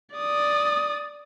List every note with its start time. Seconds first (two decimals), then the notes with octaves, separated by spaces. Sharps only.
0.15 D5 D#6